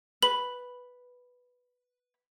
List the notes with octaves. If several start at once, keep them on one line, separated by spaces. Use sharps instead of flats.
B4 F#7